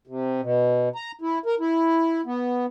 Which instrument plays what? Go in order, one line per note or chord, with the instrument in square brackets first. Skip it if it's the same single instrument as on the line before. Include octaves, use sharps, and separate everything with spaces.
[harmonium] C3
B2
A#5
E4
A#4
E4
B3